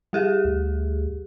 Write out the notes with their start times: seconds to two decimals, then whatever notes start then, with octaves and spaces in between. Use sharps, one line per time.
0.13 G3 G4 G#4
0.45 D2